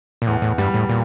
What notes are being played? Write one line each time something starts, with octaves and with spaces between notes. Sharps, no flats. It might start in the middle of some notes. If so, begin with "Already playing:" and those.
A#2
E2 A2
A2
G2 G3
A2
A#2